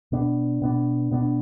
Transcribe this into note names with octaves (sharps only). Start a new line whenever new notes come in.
B2 B3 D4
B2 B3 D4
B2 B3 D4